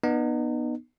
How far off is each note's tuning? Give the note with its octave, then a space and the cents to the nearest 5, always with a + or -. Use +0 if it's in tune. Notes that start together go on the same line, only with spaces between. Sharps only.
B3 -15 D#4 -35